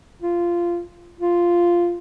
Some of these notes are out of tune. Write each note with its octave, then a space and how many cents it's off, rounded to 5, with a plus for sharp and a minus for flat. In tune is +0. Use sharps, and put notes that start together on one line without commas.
F4 -15
F4 -5